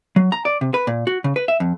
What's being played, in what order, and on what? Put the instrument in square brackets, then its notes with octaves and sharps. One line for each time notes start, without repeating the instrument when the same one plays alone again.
[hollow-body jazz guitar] F#3
A#5
D5
C3
B4
A#2
F#4
C#3
B4
E5
F2